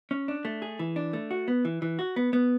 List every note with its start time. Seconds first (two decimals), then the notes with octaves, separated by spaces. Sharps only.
0.11 C#4
0.28 D4
0.45 A3
0.62 G#4
0.79 E3
0.96 D4
1.13 A3
1.31 F#4
1.48 B3
1.65 E3
1.82 E3
1.99 F#4
2.16 B3
2.33 B3